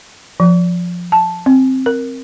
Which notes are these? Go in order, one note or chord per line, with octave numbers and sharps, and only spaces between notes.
F3
A5
C4
A#4